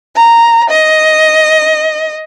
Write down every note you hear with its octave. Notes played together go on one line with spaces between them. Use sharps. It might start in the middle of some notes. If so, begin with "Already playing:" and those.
A#5
D#5